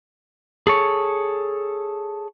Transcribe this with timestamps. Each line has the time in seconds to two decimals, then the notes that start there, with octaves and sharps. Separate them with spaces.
0.67 G#4 A4 C#5